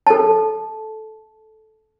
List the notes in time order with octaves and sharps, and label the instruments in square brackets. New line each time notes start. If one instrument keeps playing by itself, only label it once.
[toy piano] A4 A5